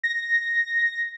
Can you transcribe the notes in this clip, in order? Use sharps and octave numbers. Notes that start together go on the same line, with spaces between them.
A#6